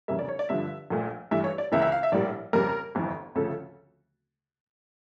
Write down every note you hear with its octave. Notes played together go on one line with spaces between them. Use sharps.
F1 E2 C#3 G3 A#3 E5
D5
C#5
D5
G2 D3 F3 E5
A#1 A#2 A3
G2 E3 A3 E5
C#5
D5
C#2 C#3 E3 A#3 E5
E5
F5
E5
A#1 A2 G3 A#3 D5
F2 C#3 G3 A#3 A#4
G1 F2 E3
D2 C#3 F3 A3 A4